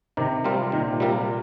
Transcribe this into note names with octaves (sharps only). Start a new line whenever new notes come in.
C3 D#3
G3 C4 F4 A#4
A#2 D#3
G3 C4 F4 A#4